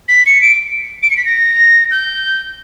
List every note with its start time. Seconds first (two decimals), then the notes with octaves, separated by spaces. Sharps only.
0.08 B6
0.26 C#7
0.42 D7
1.03 D7
1.10 C#7
1.17 B6
1.25 A#6
1.91 G6